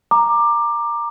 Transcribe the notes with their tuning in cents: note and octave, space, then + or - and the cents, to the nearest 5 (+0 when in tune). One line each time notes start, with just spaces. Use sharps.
A#5 +0 D6 +15